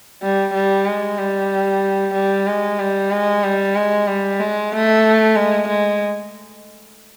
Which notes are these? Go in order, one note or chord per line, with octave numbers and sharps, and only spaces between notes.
G3
G3
G#3
G3
G3
G#3
G3
G#3
G3
G#3
G3
G#3
A3
G#3
G#3